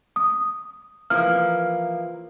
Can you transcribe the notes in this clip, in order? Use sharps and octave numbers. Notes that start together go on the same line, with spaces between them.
D#6
E3 F3 A#3 F6